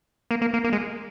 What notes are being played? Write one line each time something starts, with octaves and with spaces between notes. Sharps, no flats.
A#3
A#3
A#3
A#3
G#3